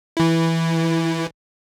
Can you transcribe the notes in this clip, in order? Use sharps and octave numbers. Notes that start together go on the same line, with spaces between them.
E3 E4